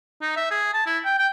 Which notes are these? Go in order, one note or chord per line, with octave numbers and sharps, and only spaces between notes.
D#4
E5
G#4
A5
E4
G5
G5